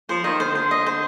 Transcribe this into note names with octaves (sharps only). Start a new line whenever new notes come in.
F3 C5
D#3 D#5
D3 C5
C5
D#5
C5